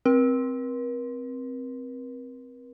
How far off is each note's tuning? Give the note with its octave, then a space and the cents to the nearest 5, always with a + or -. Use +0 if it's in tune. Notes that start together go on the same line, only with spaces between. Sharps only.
C4 +0 A#4 +45